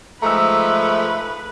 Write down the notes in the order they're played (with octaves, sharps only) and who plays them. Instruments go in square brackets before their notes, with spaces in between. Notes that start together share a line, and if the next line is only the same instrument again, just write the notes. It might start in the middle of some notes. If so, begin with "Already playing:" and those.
[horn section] G#2 F3 G#3 [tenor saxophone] A3 [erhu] B4 [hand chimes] A#5 E6